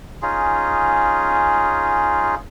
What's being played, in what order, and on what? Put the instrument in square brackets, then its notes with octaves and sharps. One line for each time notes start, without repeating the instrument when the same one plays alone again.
[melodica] C#4 D#4 F4 G#4